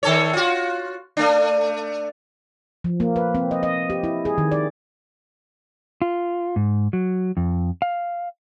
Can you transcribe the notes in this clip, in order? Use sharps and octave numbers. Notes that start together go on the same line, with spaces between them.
D#3 A4 C#5
F4 F#4
A3 D4
F3
A#3
B4
C4
D#5
D#5
G4
E4
G#4
D#3
D5
F4
G#2
F#3
F2
F5